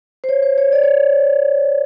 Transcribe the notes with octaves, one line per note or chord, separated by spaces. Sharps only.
C5
C#5
C5
C#5
D5
C#5